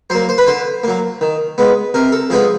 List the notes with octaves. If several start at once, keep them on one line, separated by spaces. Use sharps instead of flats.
F#3 A#3 C5
C5
B4
D3 C5
F#3 A#3
D#3
G#3 B3
C3 A#4
A4
F3 G#3 B3 G#4